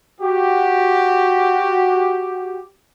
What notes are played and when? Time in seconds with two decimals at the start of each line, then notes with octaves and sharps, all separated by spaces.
0.21 F#4 G4